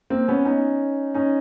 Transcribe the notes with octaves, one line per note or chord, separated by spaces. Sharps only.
A#3 C4
B3 C#4
C#4 D#4
C#4 D#4